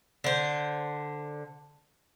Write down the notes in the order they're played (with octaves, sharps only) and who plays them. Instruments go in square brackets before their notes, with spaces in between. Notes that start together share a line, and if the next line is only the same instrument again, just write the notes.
[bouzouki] D3 C5